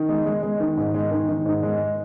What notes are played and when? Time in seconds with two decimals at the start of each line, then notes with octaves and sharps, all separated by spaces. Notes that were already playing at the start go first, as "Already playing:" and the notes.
Already playing: D#3
0.09 G#3
0.26 G#3
0.43 G#3
0.60 D#3
0.77 G#2
0.94 G#3
1.11 D#3
1.29 D#3
1.46 G#2
1.63 G#3